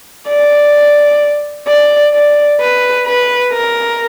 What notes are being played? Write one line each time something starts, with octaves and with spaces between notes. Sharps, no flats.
D5
D5
D5
B4
B4
A#4